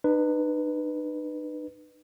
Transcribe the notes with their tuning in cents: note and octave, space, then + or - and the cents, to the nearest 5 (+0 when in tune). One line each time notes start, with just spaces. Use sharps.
D#4 -45 B4 +0